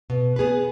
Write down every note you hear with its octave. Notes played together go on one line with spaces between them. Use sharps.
B2
B3 G#4 B4